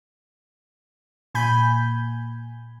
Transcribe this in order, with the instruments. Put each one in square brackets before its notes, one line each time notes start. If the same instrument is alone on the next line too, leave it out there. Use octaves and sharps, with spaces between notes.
[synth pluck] A#2 G#5 B5 G6